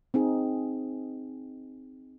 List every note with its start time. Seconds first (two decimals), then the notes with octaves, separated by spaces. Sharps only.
0.14 C4 D#4 G#4